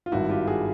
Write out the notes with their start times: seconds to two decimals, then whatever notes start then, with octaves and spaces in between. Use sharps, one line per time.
0.06 F4
0.12 G#1 G2 D#3 E4 F#4
0.29 F4 G4
0.47 F#4 G#4